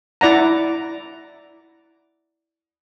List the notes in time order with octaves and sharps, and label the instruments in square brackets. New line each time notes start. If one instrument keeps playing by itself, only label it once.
[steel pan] E4 D5 F#5 A#5